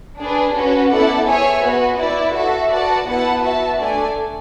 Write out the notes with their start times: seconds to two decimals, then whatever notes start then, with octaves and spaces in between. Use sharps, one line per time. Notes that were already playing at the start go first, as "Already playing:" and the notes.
0.18 D4 G#4 B4
0.54 C#4 F#4 B4
0.90 B3 E4 A4 D5 F#5
1.26 G#4 C#5 E5 G#5
1.61 B3 F#4 B4
1.97 E4 B4 D5
2.33 F#4 A4 E5
2.70 F#4 B4 D5 F#5 A5
3.05 B3 E4 B4 F#5 A5
3.42 F#4 B4 E5 A5
3.78 A3 D4 A4 D5 G#5